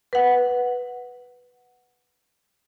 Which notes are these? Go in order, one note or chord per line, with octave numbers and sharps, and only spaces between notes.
B4 F#5